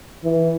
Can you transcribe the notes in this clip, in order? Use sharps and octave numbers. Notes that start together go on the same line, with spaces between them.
E3